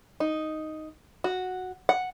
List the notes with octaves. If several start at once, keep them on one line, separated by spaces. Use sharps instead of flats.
D#4
F#4
F#5